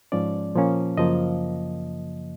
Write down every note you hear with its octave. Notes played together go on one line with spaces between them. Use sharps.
G#2 F3 G#3 C#4 D5
A#2 F3 A#3 C#4
F#2 C#3 F3 A#3 D#5